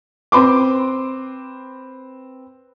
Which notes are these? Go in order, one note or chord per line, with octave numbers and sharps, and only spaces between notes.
C4 B4 C6 D6